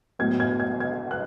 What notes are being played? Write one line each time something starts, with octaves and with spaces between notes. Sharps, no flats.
A2 F#3 B3 G#6
G#6
G#6
G#6
F#6